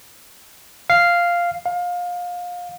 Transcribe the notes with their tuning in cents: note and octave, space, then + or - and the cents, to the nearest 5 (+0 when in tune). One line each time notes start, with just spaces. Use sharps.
F5 -5
F5 +25